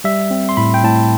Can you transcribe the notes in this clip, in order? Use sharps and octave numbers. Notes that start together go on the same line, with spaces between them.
G3 E5
C4
C6
A2 B5
G5
A2 A5